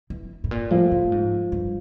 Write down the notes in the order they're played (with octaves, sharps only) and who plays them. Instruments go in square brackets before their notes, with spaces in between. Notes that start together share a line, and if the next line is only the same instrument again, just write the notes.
[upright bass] E3
A2
A#2
[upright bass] A2 [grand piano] F3
[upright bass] A2
G#2
G2